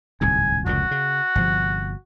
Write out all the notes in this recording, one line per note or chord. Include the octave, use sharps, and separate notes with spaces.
D1 C2 G#2 G#5
F1 C#2 A#2 F#4
C#3
G1 C3 F3